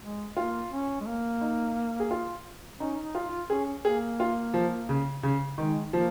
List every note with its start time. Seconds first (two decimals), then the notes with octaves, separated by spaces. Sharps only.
0.02 G#3
0.37 A#3 F4
0.71 C#4
1.01 G#3
1.06 A#3
1.41 D#4
2.00 G#4
2.11 F4
2.80 C#4 D#4
3.03 D#4
3.15 F4
3.26 F4
3.50 C#4 G#4
3.84 A#3 G#4
4.20 F4
4.54 F3
4.89 C#3
5.23 C#3
5.58 D#3 G#3
5.93 F3 A#3